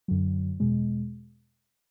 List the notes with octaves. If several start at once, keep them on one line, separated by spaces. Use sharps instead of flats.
F#2 D3 F#3
E2 B2 G#3